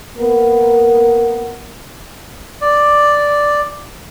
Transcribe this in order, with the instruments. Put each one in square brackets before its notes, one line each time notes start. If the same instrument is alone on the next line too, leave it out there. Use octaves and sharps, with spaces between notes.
[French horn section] A#3 B3 A#4
[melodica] D5